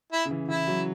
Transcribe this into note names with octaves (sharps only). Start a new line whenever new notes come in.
E4
C#3
E3
E3 E4
F#3